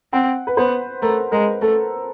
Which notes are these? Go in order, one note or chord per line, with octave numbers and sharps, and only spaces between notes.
C4 F#5
B4
B3 C5
A3 A#4
G#3 A#4
A3 A4